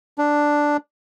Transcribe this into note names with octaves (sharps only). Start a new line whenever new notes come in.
D4